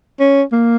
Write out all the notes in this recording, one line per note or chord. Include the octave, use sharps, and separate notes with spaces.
C#4
A#3